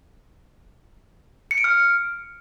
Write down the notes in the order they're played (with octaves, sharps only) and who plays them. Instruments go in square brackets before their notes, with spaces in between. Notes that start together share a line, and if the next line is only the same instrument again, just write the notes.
[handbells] C#7
D7
F6